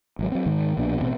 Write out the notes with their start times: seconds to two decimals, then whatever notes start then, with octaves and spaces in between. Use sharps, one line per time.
0.19 G#1 F#3
0.32 F#3 C4
0.46 G#2 D#3
0.77 A#1 B2 D4
0.99 A1 G2 B2 C4